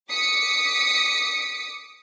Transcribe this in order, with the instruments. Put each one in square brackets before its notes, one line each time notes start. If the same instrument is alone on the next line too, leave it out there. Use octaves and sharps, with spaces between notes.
[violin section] D6 D#6 B6 C#7